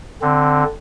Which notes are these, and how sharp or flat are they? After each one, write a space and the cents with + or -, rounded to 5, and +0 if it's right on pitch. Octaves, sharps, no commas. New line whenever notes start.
D3 +0 C4 +5